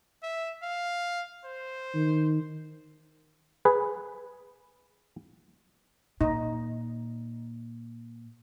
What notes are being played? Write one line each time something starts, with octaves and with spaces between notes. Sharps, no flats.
E5
F5
C5
D#3
G#4 B4
A#2 D#4